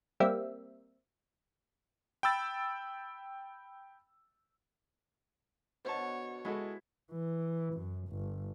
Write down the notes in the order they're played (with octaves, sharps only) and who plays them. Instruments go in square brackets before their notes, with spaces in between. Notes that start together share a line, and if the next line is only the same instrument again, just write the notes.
[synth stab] G3 A#3 C4 E5
[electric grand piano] G5 B5 E6 A6
[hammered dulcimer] B2 D3 [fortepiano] C5 A5 [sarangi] C#5
[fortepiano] G#3 F#4 A4 [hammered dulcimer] E4
[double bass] E3
F#2
G1